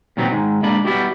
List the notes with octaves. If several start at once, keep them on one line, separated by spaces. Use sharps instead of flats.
A#2 D#3 F#3 A3 B3 C4
G#2 D#3 G#3
G#3 A#3 D4 B5
G3 B3 E4 F#4 G4